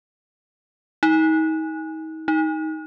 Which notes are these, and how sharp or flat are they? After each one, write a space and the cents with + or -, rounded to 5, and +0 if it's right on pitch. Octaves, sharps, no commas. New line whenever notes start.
D#4 +35
D#4 +15